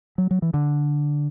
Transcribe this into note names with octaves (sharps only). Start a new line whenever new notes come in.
F#3
F#3
E3
D3